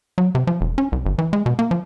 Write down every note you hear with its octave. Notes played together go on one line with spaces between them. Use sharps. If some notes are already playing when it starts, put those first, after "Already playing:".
F#3
C3
F3
E1
C#4
C2
G1
E3
G#3
B2
A#3
F3